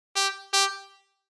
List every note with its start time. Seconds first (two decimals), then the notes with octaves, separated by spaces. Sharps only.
0.16 G4
0.54 G4